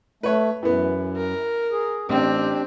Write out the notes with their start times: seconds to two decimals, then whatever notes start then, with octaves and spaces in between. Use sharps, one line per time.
0.23 A3 B4 C#5
0.63 F#2 E3 B3
1.16 A#4
1.72 G#4
2.09 A1 C4 D4 G4